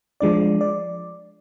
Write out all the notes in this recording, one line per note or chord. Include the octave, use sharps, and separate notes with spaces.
F3 G#3 D4 D5
D5